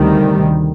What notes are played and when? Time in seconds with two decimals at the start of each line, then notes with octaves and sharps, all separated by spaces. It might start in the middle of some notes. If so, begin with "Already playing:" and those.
Already playing: D2 C3 D#3 G3